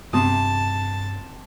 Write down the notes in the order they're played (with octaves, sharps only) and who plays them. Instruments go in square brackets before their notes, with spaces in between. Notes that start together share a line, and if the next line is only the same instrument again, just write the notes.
[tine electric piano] G2 [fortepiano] C3 D#6 [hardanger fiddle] A5